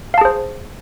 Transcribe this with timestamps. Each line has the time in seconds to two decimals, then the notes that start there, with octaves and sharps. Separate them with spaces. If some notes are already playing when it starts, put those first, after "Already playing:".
0.14 F5
0.18 A5
0.21 G#4
0.25 C5